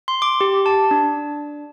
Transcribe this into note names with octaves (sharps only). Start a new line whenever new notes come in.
C6
D6
G4
A5
D4